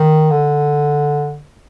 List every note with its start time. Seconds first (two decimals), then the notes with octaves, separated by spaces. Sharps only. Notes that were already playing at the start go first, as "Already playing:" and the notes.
Already playing: D#3
0.31 D3